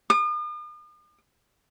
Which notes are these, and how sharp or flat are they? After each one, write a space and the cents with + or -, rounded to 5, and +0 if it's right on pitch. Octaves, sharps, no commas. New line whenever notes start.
D#6 -45